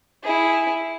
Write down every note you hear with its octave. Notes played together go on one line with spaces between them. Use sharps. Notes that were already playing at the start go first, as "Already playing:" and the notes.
E4 G#4